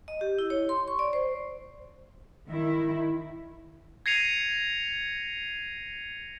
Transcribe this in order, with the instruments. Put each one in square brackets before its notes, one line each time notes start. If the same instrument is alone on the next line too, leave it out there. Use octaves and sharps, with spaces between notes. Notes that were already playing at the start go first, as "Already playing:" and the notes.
[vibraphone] D#5
G4
E4
C#5
C6
C#6
D5
C5
[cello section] D#3 E4
[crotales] G#6 A#6 C7 C#7 D#7 F7